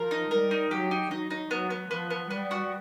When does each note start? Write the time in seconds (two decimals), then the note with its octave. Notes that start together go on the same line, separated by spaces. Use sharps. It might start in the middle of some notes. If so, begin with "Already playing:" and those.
Already playing: F3 A#4
0.11 D#4
0.31 G3 A#4
0.51 D#4
0.71 F#3 G4
0.91 D#4
1.11 F#3 D#4
1.31 D#4
1.51 F#3 B3
1.70 B3
1.91 F3 B3
2.10 B3
2.30 G3 B3
2.51 F#4